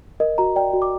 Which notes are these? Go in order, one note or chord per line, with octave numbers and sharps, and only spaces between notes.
A#4 D#5
F#4 A#5
D5 G5
F#4
D6